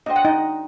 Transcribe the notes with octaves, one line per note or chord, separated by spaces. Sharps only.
D4 F#4 C5 D#5 G5
F#5
D#4 D#5